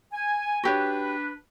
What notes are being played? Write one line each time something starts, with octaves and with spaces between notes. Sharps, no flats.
G#5
D4 F#4 G4 B4 C#5